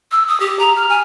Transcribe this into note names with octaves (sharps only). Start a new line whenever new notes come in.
E6
D#6
G4
A#5
F6
G#5